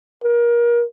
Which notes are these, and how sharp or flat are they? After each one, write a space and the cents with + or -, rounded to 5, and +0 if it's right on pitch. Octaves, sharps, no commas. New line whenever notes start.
A#4 +30